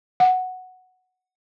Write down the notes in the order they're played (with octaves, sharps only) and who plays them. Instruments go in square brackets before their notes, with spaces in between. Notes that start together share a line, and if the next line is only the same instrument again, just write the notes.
[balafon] F#5